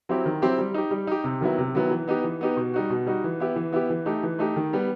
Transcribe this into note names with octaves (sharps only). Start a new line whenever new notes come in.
F#3 C4 E4 G4
D#3
F#3 C4 E4 G4
G3
D#4 G4
G3
D#4 G4
C3
D#3 F#3 B3 E4
C3
D#3 F#3 B3 E4
E3
B3 D#4 G4
E3
B3 D#4 G4
B2
G3 D#4 F#4
B2
G3 D#4 F#4
E3
B3 E4 G4
E3
B3 E4 G4
E3
A3 D#4 G4
E3
A3 D#4 G4
D#3
G3 B3